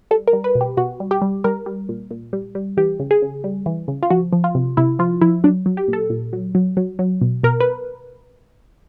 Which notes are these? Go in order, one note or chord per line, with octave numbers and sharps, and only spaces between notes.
G3 A4
A#4
G3
B4
B2
G4
B2 F#4
G3
G4
G3
G3 A#4
G3
A#2
A#2
G3
G3
E3 G4
C#3
G#4
C#3
G3
E3
C#3
F4
F3 F#4
F3
F4
C3
C3 E4
F3 F4
F3 E4
F#3 D4
F#3
G4
A#2
A4
A#2
F#3
F#3
F#3
F#3
B2
B2 A#4
B4